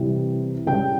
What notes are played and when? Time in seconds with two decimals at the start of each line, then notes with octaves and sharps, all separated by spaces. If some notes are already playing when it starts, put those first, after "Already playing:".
Already playing: C3 E3 G3
0.66 C#3 G3 G5